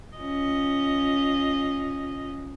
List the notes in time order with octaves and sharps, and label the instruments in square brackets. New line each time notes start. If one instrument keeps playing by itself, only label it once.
[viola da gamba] C#4 F4 D#5